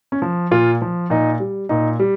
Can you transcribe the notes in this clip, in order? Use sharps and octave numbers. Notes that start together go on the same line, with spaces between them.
C#4
F3
A#2 F4
F3
A#2 D#4
G3
A#2 D#4
G3